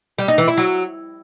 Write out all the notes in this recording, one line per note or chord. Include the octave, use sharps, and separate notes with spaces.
G3
D#4
E3
E4
F#3